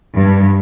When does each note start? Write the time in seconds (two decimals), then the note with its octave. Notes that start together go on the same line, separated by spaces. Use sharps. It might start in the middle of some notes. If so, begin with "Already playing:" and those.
0.15 G2